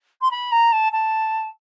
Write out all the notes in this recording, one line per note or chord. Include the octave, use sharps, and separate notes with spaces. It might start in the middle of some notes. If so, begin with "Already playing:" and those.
C6
B5
A#5
A5
A5